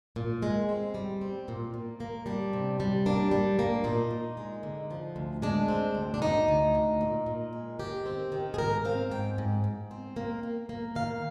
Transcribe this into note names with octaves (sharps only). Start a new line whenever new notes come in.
A#2
G#3
C4
G3
C4
A#2
A#2
A#3
G3 D4
C3
G3
A#3 D4
G3
A#3
A#2 D#4
A#2
G#3
D3
F3
D2
G#3 D4
C4
D2
D4
D2 D#4
D2
D2
A#2
A#2
G#3
D#3 G4
C4
D#3
G#4
G#2 A#4
C4 F5
G#2 G5
G#2
G#2
C4
A#3
A#3
A#3
D#3 F5